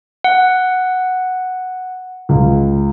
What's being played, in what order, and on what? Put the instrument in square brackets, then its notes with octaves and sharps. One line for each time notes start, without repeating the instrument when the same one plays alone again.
[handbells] F#5
[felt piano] C#2